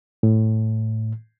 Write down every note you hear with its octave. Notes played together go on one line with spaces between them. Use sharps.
A2